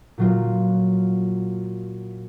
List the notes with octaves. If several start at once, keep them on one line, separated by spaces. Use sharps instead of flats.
A#2 F#3 F4